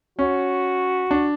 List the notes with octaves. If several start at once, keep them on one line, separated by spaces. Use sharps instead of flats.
C#4 F#4
D4